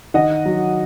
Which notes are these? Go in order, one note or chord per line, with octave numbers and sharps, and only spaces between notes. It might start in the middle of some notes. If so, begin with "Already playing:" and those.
D#3 D#5 F#5
F#3